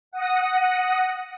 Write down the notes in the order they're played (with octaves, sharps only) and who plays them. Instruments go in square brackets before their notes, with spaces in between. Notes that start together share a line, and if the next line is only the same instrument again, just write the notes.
[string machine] F#5 D#6 A#6